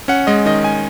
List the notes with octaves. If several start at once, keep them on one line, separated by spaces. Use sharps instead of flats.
C#4 F#5
G#3 D#5
D#3 D#5
G#5